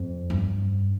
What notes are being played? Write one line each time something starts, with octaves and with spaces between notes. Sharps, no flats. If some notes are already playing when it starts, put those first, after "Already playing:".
Already playing: F2
G2